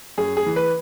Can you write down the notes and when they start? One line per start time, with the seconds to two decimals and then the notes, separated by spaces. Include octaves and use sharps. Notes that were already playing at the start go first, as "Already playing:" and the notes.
0.18 F#2 G#4
0.37 G#4
0.46 E3
0.56 B4